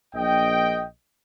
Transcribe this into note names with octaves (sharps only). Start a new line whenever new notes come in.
A#1 D#5 G5